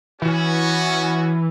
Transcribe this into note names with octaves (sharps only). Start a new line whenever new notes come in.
E3 B3 C#4 F#4